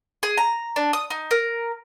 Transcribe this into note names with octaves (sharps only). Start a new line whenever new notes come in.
G#4
A#5
D4
D#6
D#4
A#4